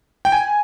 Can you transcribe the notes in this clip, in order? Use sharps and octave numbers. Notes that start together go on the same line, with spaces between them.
G5
G#5